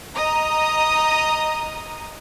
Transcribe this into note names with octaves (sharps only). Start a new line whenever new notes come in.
D#5 A#5 D#6